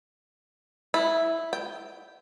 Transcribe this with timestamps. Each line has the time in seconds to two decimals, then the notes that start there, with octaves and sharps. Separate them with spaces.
0.94 E4
1.53 G5